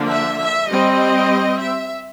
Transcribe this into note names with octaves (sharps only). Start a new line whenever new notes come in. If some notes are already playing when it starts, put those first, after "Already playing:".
Already playing: D3 F3 A#3 D4
E5
E5
G3 C4 D#5
E5